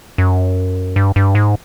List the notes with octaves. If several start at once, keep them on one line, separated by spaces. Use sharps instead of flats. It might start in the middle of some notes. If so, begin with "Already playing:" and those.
F#2
G2
G2
G#2